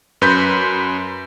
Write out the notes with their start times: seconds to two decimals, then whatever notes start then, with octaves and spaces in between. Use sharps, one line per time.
0.22 F#2 B4 C6 G6 B6